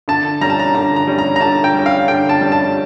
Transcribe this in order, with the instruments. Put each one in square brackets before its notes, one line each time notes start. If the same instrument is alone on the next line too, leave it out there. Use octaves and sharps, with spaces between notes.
[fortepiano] D3 A5
G3 C#4 A#5
A5
A#5
D3 A#5
A#5
G3 C#4
A#5
A#5
D3 A5
G5
G3 C#4
F5
D3 G5
A5
G3 C#4
A5